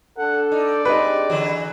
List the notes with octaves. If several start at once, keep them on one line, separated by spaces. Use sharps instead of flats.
D4 A4 F#5
D#4 D5
G#3 C4 D4 D#4 G4 B4
D3 E3 F#3